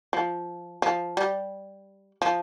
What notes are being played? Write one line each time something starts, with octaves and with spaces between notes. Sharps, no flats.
F3
F3
G3
F3